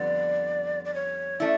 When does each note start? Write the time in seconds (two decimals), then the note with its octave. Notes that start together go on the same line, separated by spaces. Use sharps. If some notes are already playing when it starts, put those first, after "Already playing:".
Already playing: F2 D3 G3 B3 D5
0.85 D5
0.94 C#5
1.40 A3 C#4 E4 D5